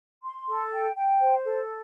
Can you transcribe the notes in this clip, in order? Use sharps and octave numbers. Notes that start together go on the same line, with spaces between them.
C6
A4
G5
G5
C5
A4